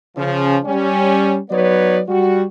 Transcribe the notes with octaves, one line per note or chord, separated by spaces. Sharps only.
C#3 F3 C#4
G3 C#4
F#3 B3 D#4 B4 C#5 D5
G3 F#4